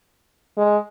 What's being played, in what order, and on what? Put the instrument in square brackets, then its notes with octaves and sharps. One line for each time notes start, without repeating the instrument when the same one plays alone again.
[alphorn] G#3